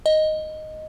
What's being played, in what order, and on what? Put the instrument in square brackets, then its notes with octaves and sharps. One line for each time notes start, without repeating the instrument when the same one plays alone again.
[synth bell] D#5